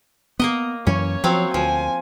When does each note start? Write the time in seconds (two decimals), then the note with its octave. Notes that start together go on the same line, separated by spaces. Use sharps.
0.40 A#3 B3 A#4 D#5
0.87 F#2 E3 C#4 C#5
1.24 F3 F#3 C4 F5
1.54 D2 F3 G#5